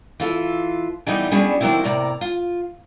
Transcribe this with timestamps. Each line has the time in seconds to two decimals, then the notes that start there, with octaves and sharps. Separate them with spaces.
0.20 E3 F4 A4
1.06 E3 F#3 G3 A3 B3 D#4
1.31 G3 B3 C#4 D4 F#4 G#4
1.61 D#3 F#3 A3 A#3 C4 E4
1.84 A2 C3 A#3 D5 A#5
2.21 F4